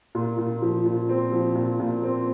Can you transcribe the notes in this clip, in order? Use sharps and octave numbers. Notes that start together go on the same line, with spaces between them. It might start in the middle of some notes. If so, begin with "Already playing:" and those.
A#2
A#2
F3
A#2
C4
F3
A#2
A#2
C4